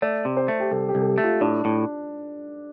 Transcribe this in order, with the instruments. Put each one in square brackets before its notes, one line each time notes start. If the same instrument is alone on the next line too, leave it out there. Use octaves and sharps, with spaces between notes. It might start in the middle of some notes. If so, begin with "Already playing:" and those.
[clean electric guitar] A3 [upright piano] D5
[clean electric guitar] C3
[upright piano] C5
[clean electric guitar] A3
[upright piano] G4
[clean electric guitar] C2 [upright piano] A4
[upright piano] G4
[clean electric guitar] C2
[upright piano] A4
G4
[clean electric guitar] A3
[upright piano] F4
[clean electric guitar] A2 [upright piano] D4
[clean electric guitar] A2